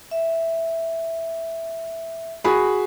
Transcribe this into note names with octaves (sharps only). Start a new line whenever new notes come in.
E5
F#4 G#4 B5